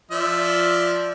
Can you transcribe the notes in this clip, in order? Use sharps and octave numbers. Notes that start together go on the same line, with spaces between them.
F3 D5 E5